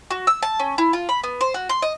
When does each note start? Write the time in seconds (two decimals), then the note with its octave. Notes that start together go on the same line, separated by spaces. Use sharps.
0.11 F#4
0.27 E6
0.43 A5
0.59 C#4
0.78 E4
0.93 F4
1.09 B5
1.24 B3
1.41 C5
1.54 F#4
1.69 C6
1.82 D#5